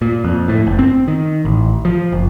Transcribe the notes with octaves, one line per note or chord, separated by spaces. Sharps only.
A#2
F2
A2
F#1
C4
D#3
A1
F3
F#1